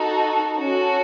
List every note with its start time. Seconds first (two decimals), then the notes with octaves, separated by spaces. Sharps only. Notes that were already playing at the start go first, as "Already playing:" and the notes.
Already playing: D#4 F#4 A4
0.57 C#4 F#4 A4